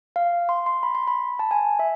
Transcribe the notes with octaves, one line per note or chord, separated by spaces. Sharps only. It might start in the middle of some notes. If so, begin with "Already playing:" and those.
F5
C6
C6
B5
C6
B5
A5
G#5
E5